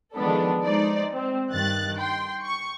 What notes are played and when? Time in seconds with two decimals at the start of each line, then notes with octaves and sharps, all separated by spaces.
0.14 D#3 F3 G#3 B3 D4 A4
0.63 G#3 D#4 C5 D5
1.11 C4
1.51 G2 D#3 F#6 A6
1.99 G5 C6
2.44 C#6